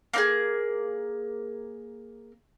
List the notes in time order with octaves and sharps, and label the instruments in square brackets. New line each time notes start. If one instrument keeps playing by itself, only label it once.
[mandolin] A#3 D#4 G#4